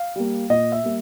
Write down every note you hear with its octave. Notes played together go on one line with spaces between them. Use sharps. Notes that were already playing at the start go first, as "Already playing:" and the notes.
Already playing: F5
G3 A#3
A#2 D#5
E5
G3 A#3